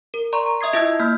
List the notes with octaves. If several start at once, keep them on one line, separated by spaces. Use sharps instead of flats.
A#4
D5 A#5 C6 C#6
A#5
D#5 E5 D#6 G#6 C7
E4 F4 D#5 A5 E6 G#6
A#3 F6 G6